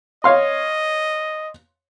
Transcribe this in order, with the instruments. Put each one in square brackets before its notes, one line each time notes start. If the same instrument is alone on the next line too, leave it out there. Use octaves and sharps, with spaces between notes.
[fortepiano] C#5 F5 C6 [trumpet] D#5